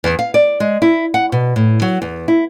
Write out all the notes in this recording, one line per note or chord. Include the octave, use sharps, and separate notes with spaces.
E2
F5
D5
G#3
E4
F#5
B2
A2
F#3
E2
E4